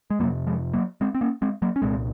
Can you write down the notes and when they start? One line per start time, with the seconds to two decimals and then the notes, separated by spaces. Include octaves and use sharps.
0.10 G#3
0.19 F2 F#3 A#3
0.23 C3
0.47 F3 G#3
0.73 F#3 A#3
1.01 G#3 C4
1.14 C4
1.21 A#3 C#4
1.42 G#3 C4
1.62 F#3 A#3
1.76 C#4
1.82 C2 A#2 G#3 C4